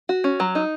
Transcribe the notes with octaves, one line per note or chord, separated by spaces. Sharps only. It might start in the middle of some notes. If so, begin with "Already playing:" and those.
F#4
C#4
F#3
D#4